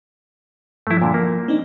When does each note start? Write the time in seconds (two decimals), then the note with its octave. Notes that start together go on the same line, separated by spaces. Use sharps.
0.87 G2 F3 A3 E4
1.02 A#2 D3
1.14 F3 A#3
1.48 C4 D4 D#4